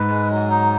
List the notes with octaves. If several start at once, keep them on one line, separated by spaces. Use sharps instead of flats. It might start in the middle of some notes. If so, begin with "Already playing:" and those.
Already playing: G#2 B4
G#3
F#3
D#4